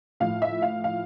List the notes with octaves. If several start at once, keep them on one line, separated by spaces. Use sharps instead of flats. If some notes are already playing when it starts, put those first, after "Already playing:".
A2 F3 F5
E5
F5
F5